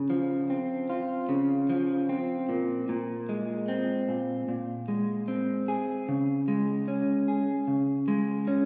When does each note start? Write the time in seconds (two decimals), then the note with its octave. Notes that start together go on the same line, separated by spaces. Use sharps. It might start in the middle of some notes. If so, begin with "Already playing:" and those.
Already playing: C#3
0.10 F3
0.50 C4
0.90 F4
1.29 C#3
1.70 F3
2.09 C4
2.49 A#2
2.89 A#2
3.29 G#3
3.68 C4
4.09 A#2
4.48 A#2
4.88 G#3
5.28 C4
5.68 G#4
6.09 C#3
6.48 G#3
6.88 C#4
7.28 G#4
7.68 C#3
8.08 G#3
8.48 C#4